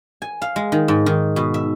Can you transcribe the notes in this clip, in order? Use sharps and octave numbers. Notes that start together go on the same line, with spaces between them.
G#5
F5
G#3
D#3
G#2
D#3
B2
E5